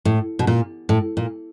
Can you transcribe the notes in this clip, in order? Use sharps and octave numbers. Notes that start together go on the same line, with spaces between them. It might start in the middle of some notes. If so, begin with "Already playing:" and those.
A2
B2
A#2
A2
A#2